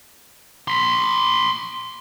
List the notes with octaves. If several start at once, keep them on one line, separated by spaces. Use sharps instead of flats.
B5 C6